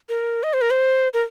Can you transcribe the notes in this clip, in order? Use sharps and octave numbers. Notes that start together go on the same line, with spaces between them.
A#4
D#5
C5
A#4
C5
A#4